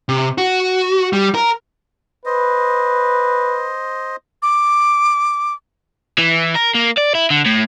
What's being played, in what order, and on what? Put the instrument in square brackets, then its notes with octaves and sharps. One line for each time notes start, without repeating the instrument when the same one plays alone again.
[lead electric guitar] C3
F#4
G3
A#4
[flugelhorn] B4 [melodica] C5 D#5
[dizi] D6
[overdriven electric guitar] E3
A#4
A#3
D5
E4
D3
A2